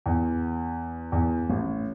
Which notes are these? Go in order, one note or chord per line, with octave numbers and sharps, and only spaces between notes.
E2
E2
A1